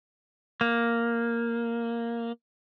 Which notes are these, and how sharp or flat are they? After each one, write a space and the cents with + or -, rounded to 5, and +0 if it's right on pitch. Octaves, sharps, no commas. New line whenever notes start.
A#3 +0